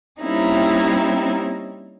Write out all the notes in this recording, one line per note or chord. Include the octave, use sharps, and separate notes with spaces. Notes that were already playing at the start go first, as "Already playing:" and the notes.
G3 A#3 C4 C#4 D#4 E4